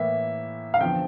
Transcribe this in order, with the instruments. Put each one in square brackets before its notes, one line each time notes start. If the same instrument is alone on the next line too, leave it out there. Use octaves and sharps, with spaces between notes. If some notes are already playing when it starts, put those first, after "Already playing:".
Already playing: [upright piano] A2 E3 A#3 E5
F5
E2 D3 F3 C4 G5